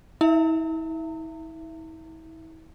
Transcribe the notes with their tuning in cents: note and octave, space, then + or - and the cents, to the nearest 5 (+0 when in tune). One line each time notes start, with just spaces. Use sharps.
E4 -40 E5 +25 A#5 -40